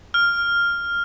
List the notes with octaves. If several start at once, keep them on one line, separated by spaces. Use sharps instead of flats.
F6